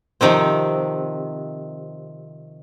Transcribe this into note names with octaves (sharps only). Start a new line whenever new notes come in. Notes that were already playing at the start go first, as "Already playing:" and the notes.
C3 D#3 F3 C4